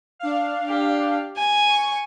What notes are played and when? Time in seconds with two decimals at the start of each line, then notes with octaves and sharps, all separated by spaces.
0.19 D4 F5
0.68 G4
1.37 G#5
1.69 C#6